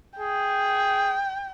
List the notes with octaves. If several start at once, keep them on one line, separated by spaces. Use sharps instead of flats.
G#4 G5